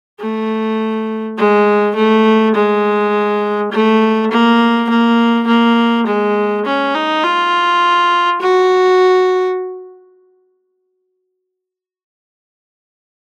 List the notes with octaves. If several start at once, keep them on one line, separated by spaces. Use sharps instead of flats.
A3
G#3
A3
G#3
A3
A#3
A#3
A#3
G#3
C#4
D#4
F4
F#4